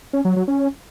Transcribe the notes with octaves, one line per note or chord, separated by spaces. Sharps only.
C#4
F#3
F#3
C#4